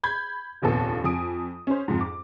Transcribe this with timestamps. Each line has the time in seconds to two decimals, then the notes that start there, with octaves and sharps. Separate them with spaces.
0.03 B5 G6 G#6
0.62 F1 A#1 D#2 B3 A4
1.04 F2 G#5 D#6 D7
1.67 C#4 C5
1.88 F2 G#2
2.01 D6